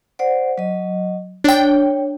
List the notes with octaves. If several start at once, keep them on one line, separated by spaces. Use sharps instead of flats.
C5 D5 F#5
F#3 D#5
D4 C#5 G5